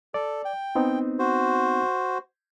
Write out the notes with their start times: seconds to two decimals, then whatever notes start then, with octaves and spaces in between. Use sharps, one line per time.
0.14 A4 D5
0.45 G5
0.75 B3 C4 D#4
1.19 F#4 C5